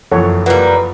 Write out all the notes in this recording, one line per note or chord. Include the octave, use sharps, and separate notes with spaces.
F#1 F2 E3 A4 C#5 F#5
G3 A#3 F4 B4 F#5